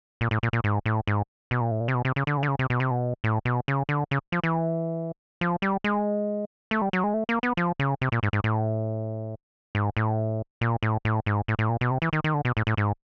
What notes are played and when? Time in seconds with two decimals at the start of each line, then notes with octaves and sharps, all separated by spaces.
0.21 A#2
0.31 A2
0.43 A#2
0.53 A#2
0.64 G#2
0.86 A2
1.07 G#2
1.51 B2
1.61 A#2
1.71 A2
1.81 A#2
1.88 C3
1.95 B2
2.05 C3
2.16 C#3
2.27 D3
2.37 C#3
2.43 D3
2.48 C#3
2.59 C3
2.70 B2
2.80 C3
2.91 B2
3.24 A2
3.45 B2
3.68 C#3
3.89 D3
4.11 C#3
4.32 F3
4.44 E3
5.41 F3
5.62 G3
5.84 G#3
6.71 A3
6.82 G3
6.93 F#3
7.04 G#3
7.14 A3
7.29 A#3
7.43 B3
7.57 F3
7.80 C#3
8.01 C3
8.12 A#2
8.23 G#2
8.33 G#2
8.44 A2
9.75 G#2
9.97 A2
10.61 A#2
10.83 A2
11.05 A2
11.26 G#2
11.48 A2
11.59 A2
11.69 A#2
11.81 B2
11.91 C3
12.02 E3
12.13 D#3
12.24 D#3
12.34 D3
12.45 B2
12.57 A2
12.67 A2
12.77 G#2